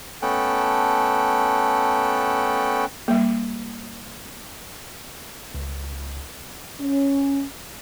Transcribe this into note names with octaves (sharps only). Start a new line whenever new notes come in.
A3 B3 C#4 A4 G5 F#6
G3 A#3
C#2
C#4